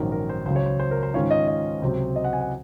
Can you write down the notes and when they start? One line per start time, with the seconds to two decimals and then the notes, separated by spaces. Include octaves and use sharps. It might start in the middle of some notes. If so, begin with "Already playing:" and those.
Already playing: A#1 G#2 D#3 F#3 C#4 A#4
0.12 A#4
0.29 C5
0.46 C#2 C#3 F#3 C5
0.56 C#5
0.66 C5
0.80 C5
0.91 A#4
1.03 C5
1.14 G#2 D#3 G#3 C#4 F4 C#5
1.31 D#5
1.48 D#5
1.81 C#2 C3 F#3 C4
2.16 D#5
2.24 F#5
2.33 G#5
2.41 F#5